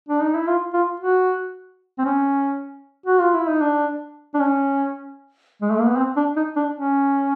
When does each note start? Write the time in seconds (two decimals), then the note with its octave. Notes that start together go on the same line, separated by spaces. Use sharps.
0.09 D4
0.22 D#4
0.35 E4
0.47 F4
0.74 F4
1.00 F#4
1.98 C4
2.05 C#4
3.06 F#4
3.20 F4
3.34 E4
3.48 D#4
3.62 D4
4.34 D4
4.40 C#4
5.62 G#3
5.71 A3
5.79 A#3
5.88 B3
5.97 C4
6.16 D4
6.36 D#4
6.56 D4
6.75 C#4